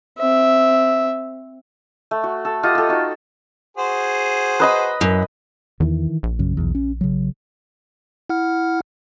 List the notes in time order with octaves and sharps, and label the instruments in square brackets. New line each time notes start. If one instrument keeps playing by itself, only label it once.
[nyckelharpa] C4 E5
[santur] A3
F#4
A4
F4 G4 D#5 F#5
G4 A4
D#4 F#4
[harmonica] F#4 G#4 C5
[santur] B4 D#5 B5
[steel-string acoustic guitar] F#2
[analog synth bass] E2 [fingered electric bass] D#3 E3
[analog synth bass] A#1
[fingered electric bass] F#2 C#3
B1 E2
C#4
C#3 F#3
[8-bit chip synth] E4 F#5 F6